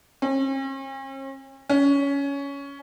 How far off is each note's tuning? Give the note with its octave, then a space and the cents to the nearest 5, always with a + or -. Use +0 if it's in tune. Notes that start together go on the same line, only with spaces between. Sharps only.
C#4 -45
C#4 +15